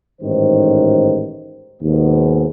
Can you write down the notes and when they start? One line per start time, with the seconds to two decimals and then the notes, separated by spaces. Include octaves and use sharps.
0.20 A1 G#2 D#3 C5
1.82 D#2 G#2 B2